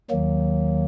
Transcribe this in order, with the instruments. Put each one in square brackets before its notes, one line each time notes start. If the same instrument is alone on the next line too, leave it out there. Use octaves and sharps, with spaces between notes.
[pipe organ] D#2 D#3 F#3 A#3